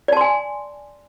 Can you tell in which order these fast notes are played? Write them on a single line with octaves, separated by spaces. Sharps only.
D5 A5 C6 G#5